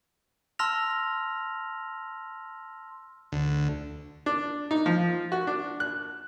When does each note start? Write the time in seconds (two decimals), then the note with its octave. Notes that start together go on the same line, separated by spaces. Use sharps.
0.59 A5 C6 E6 F6 A#6 F7
3.32 D2
4.26 D4
4.71 D#4
4.86 F3
5.32 F#4
5.47 D4
5.80 F#6